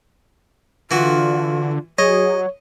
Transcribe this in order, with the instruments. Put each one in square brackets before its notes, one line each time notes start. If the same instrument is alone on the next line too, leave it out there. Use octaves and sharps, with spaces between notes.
[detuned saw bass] D3 [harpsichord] E3 F#4 [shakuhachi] F4
[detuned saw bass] F#3 [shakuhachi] G#4 [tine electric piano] C#5 [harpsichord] D#5